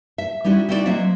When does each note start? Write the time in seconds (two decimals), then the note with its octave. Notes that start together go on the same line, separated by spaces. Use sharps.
0.18 E5
0.44 G3 C#4 D#4 E4 F#4
0.69 C4 D#4 E4 F#4 A#4 D5
0.86 F#3 A#3 C4 C5 D#5 E5